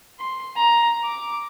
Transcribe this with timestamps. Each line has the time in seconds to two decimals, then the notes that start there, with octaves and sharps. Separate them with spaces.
0.19 C6
0.56 A#5
1.03 D6